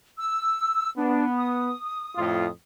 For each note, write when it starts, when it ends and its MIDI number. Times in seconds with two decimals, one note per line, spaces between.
0.18 0.91 88
0.97 1.70 59
0.97 1.24 62
1.37 2.49 87
2.16 2.47 41
2.16 2.47 45
2.16 2.47 65